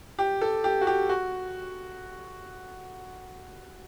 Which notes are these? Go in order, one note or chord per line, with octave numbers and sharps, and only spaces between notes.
G4
A4
G4
F#4
G4
F#4